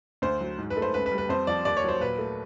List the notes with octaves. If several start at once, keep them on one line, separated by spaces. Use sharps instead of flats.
D2 C5
F#3
G#2
B4
A3
C5
C#2 B4
B4
G3
B4
F2 C5
F3 D5
D#2 D5
C#5
F#3 C5
A#2 B4
A3